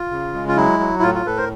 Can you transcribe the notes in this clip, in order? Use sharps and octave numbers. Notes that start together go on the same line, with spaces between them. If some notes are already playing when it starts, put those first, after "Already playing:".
Already playing: F4
C#3
G#3
F4
F#3 E4
F#3
E4
A2 F4
F4
A2 A4 B4
A#4 C5